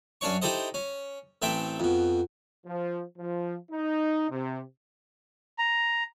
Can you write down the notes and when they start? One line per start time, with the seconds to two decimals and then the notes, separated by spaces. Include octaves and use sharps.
0.21 F#2 C#4 D4 C#5 C#6
0.42 D#4 E4 G4 A4 C5 D#5
0.74 C#4
1.42 A1 E3 A3 C4 E5 G5
1.80 F2 B2
2.66 F3
3.18 F3
3.72 D#4
4.30 C3
5.59 A#5